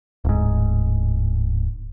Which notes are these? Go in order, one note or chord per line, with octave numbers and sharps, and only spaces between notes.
D1 G#2